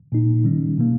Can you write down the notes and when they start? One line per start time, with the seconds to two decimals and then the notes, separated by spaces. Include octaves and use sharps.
0.12 A#2 A#3 D#4
0.44 D#3 G3 C#4
0.78 B2 G3 A#3